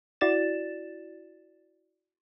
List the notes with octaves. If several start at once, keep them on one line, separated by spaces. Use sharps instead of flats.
E4 F#4 D5 A6 E7